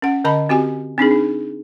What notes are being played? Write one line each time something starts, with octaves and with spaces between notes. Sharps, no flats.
C#4 F#5
D3 D#5 A5 B5
C4 F#4 G4 G#5
C4 D4 D#4 G#4
D#4